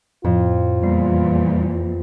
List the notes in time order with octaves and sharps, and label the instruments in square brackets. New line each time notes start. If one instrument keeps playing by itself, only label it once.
[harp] F2 [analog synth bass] A2 [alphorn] F4
[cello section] E2 A#2 [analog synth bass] G3 [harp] C7